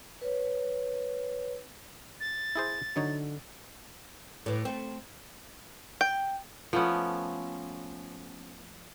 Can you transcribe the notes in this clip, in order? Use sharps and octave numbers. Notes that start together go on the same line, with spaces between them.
B4 C#5
A6
E4 G#4 C5
D3 F#3 D#4 C#5
A2 E3
A3 C4
G5
F3 A3 B3 C#4